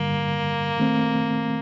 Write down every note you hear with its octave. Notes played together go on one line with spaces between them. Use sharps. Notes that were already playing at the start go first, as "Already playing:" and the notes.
Already playing: G2 D3 G3 A#3
D#3 A3 C4